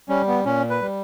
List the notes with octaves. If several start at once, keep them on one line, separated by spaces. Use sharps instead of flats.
G3 C#4
B3
A#2 C#4
B4
G3